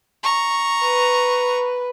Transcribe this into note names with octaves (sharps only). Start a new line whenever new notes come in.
A#5 C#6
B4